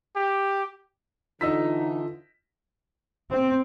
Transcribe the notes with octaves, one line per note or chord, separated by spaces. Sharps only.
G4
D3 E3 D#4 F4 D#5 E6 B6
C4